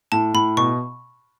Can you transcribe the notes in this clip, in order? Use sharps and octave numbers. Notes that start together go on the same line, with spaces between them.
A2 A5
A2 B5
B2 C#6